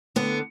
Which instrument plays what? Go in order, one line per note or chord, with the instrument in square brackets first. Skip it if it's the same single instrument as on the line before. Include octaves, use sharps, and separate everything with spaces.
[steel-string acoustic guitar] D3 B3